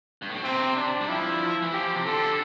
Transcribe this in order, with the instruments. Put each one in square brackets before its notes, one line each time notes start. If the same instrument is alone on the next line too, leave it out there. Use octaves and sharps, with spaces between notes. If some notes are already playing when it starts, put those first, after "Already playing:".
[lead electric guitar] G2
A2
B2
[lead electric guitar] C3 [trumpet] C4
[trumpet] D4
[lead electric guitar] G3
[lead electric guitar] F3 [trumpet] E4
[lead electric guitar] E3
[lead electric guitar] F3 [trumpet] G4
[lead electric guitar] C3
[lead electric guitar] D3 [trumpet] A4